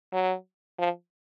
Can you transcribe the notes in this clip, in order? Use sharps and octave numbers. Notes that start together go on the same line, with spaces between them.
F#3
F3